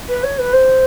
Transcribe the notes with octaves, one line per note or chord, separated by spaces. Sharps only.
B4
C#5
B4
C5